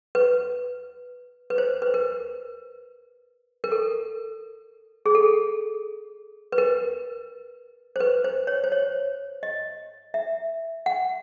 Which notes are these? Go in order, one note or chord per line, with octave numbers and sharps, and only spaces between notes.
B4
B4
C5
B4
A#4
A#4
A4
G#4
A4
B4
A#4
C5
B4
C5
C#5
C5
C#5
D#5
E5
F#5